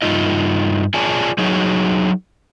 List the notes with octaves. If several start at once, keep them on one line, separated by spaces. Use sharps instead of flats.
G2 D#4 F4 D#5
F4 G#4 C#5 D5 G#5 A5
F#3 D#4 F#4 G#4 C#5